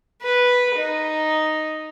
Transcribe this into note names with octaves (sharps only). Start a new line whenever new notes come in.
B4
D#4